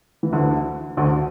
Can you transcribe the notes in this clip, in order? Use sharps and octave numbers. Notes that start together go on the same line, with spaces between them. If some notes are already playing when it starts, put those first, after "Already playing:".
E3
D2 D3
D2 D3